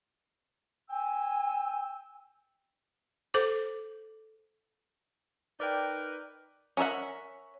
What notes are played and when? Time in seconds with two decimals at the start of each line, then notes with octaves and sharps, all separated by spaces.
0.90 G5 G#5 E6
3.34 A4 C5 D6
5.60 D#4 A#4 B4 D5 G5
6.77 C#4 A#4 C5 E5 F#5